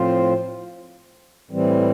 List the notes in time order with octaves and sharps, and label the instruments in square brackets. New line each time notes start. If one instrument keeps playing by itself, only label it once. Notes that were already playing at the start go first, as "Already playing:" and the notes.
Already playing: [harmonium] A2 F3 C4 F4 C5
A2 E3 G3 C4